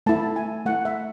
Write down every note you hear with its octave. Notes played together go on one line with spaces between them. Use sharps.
A3 E4 A5
G#5
A3 E4 F#5
E5